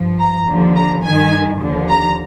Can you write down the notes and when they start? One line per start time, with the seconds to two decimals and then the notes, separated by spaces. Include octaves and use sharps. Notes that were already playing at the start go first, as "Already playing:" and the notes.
Already playing: G2 F3
0.19 A#5
0.47 D#2 D3 F3
0.75 A#5
1.04 G2 D#3 G#5
1.60 D#2 D3 F3
1.89 A#5